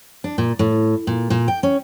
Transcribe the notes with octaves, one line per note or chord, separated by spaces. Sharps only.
D4
A#2
A2
A#2
A#2
G5
C#4